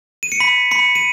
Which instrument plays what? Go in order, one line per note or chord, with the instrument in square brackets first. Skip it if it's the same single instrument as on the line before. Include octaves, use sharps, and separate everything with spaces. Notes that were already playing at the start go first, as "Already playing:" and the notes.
[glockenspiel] D#7
C#7
B5 B6
B5 C#7
D#7